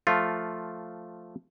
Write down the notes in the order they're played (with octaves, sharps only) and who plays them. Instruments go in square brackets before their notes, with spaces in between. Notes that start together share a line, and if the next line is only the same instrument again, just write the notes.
[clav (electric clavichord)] F3 A3 F4